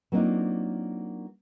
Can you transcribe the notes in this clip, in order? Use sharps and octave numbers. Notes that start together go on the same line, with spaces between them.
F#3 A#3 C4 D4 D#4 F4